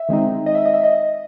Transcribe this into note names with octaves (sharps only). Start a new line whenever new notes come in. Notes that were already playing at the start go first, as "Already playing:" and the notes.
Already playing: E5
D#3 G#3 C4 D#4
D#5
E5
D#5
E5
D#5